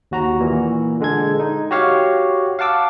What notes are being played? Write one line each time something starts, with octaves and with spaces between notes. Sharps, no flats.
D#2 F#4 A#5
A#2 E3
D3 G#3 A4 G#6
D#4
F#4 G4 C#5 F5 F#5
F5 F#5 A5 D6 E6